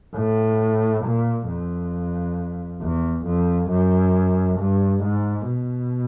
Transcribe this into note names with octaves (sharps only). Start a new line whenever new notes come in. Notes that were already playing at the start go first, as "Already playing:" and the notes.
A2
A#2
F2
E2
F2
F#2
G2
G#2
B2